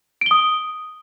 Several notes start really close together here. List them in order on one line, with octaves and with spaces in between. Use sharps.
D7 G7 D#6